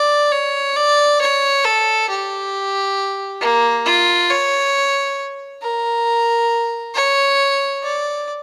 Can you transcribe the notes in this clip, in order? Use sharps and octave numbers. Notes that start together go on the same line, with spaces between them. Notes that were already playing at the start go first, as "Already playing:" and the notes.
Already playing: D5
C#5
D5
C#5
A4
G4
A#3
F4
C#5
A#4
C#5
D5